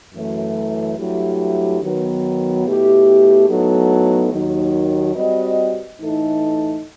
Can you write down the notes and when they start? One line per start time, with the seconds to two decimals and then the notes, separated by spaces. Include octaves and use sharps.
0.14 F#2 E3 A3
0.97 G2 F#3 A3 E4 G4
1.81 D#3 F#3 B3
2.65 B2 A3 E4 G4
3.48 A2 F#3 B3 D#4 A4
4.32 D#2 D#3 F#3
5.14 G3 C4 F#4 B4 D#5
5.98 A2 E3 A3 D#4 A4